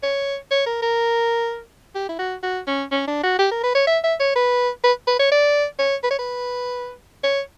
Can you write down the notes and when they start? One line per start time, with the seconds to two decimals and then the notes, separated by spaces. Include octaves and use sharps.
0.03 C#5
0.51 C#5
0.66 A#4
0.82 A#4
1.95 G4
2.09 E4
2.18 F#4
2.43 F#4
2.67 C#4
2.91 C#4
3.07 D4
3.23 F#4
3.39 G4
3.51 A#4
3.63 B4
3.75 C#5
3.87 E5
4.03 E5
4.20 C#5
4.36 B4
4.84 B4
5.07 B4
5.19 C#5
5.31 D5
5.79 C#5
6.03 B4
6.11 C#5
6.19 B4
7.23 C#5